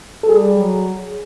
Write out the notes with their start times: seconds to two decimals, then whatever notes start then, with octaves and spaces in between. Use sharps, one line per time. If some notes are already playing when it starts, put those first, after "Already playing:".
0.23 A4
0.28 G3 G#4
0.57 F#3